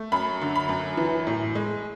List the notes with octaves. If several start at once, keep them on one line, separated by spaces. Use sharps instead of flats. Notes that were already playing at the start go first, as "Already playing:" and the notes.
Already playing: A3
F#2 B5
D3
B5
F#2
E3
A2
G#3